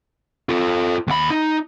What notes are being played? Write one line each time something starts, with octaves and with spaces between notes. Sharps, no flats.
F4 A4
D#2 B5
D#4